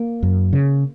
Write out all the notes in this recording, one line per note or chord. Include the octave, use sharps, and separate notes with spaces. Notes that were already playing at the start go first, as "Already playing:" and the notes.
Already playing: A#3
F#2
C#3